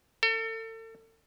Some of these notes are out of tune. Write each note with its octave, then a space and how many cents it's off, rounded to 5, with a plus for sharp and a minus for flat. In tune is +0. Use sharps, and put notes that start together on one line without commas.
A4 +35